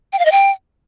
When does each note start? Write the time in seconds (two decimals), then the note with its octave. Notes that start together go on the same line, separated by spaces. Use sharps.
0.13 G5
0.19 F5
0.25 D#5
0.32 G5